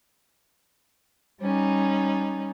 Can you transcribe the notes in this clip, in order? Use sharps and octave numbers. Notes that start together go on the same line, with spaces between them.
G3 C#4 D#4